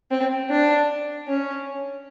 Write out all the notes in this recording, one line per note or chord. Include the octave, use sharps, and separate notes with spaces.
C4
D4
C#4